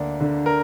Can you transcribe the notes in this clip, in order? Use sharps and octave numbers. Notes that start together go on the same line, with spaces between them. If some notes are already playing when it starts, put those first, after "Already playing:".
Already playing: D2 A#3 D4
D3
A#4